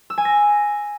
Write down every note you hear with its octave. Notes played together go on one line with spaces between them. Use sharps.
E6
G#5
A#6